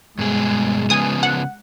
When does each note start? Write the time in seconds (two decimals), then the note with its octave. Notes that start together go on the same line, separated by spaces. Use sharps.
0.19 G2 B2 G#3 G#4
0.90 C#3 F3 B3 G#5 D#6
1.23 F#5